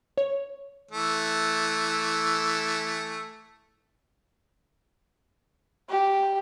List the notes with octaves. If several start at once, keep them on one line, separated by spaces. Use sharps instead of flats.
C#5
E3 A3
G4